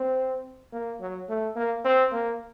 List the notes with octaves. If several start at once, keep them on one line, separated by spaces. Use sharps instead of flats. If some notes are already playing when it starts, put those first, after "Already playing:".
Already playing: C4
A#3
F#3
A3
A#3
C4
A#3